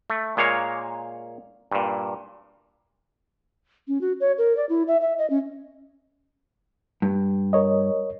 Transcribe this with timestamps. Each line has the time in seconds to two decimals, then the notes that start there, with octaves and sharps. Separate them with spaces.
0.10 A3
0.37 A#2 G#3 A#3 C#5 F5
1.72 G2 A#2
3.88 C#4
4.01 F#4
4.20 C#5
4.38 A#4
4.57 D5
4.69 E4
4.88 E5
5.01 E5
5.18 D#5
5.30 C#4
7.02 G2
7.53 A#4 C#5 D#5